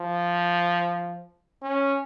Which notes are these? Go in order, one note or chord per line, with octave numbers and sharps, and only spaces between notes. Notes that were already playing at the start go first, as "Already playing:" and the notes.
Already playing: F3
C#4